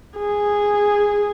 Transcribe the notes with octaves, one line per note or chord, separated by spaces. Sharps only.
G#4